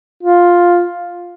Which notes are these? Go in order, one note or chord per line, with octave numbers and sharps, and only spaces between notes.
F4